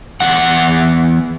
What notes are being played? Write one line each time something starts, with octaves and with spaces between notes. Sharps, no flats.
E2 F#5